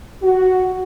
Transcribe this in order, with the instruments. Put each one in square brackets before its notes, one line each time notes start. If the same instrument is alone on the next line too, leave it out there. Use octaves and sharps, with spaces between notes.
[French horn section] F#4